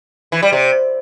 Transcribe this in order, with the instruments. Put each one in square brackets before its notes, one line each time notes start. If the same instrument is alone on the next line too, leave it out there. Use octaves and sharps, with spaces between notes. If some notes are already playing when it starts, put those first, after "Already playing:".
[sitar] E3
G3
C3